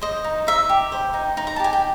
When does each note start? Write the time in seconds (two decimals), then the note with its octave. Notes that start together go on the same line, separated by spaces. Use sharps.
0.01 C5 D#5
0.24 D#4
0.47 D#4 E5
0.69 G4
0.92 C5
1.14 D#4
1.37 D#4
1.47 A#5
1.56 A5
1.59 G4 G#5
1.73 G5